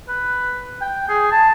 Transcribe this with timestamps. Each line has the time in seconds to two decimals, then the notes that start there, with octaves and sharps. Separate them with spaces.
0.09 B4
0.81 G5
1.09 G#4
1.31 A5